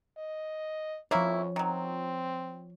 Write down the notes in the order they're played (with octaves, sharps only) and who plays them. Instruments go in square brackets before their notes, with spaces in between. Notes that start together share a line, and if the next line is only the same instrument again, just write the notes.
[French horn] D#5
[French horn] F2 [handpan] F3 C#5 [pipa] A#3 C4 E4
[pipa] D#3 F#3 [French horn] C4